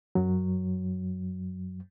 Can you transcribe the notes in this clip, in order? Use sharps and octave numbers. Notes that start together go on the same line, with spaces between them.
F#2 F#3